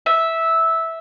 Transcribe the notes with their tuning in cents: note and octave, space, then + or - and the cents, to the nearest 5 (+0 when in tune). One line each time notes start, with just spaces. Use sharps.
E5 -10